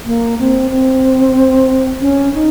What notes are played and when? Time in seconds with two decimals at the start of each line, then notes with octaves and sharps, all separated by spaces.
0.05 A#3
0.39 C4
0.71 C4
2.01 C#4
2.34 D#4